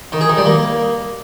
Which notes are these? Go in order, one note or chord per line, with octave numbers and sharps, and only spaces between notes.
D#3
G#4
D#3
G3
A#3